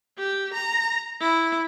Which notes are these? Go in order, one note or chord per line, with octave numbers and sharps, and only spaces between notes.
G4
A#5
E4